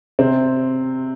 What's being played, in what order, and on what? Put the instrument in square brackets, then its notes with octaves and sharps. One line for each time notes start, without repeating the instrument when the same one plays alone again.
[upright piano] C3 C4